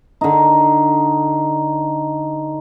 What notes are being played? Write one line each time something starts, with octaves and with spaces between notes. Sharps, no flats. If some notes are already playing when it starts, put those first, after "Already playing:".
D3 D#4